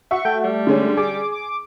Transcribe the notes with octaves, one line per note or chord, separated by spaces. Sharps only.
F#4 E5 C#6
A3 G5
G3
D3 G#3 C#4
G#4 D6
D6